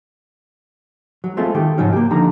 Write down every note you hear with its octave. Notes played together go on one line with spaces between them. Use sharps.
F#3
G#3 A3 C4 F4
D#3 A3 G4
G#2 C#3 F3 F#3 C#4 D#4
A#3 G4
C#2 D3 F3 D#4 A#5